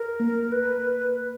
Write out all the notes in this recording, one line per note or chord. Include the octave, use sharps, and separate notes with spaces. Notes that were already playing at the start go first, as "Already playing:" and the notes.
Already playing: A#4
A#3
B4